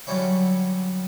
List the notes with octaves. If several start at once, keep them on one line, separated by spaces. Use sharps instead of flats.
D3 F#3 G3 C#4 E4